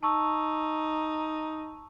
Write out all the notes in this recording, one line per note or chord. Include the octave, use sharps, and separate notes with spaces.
D#4 A5 C#6 E6